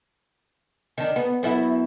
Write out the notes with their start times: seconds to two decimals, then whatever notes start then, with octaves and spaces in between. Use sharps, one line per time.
0.98 D#3 D4
1.16 B3
1.43 F#2 B3 E4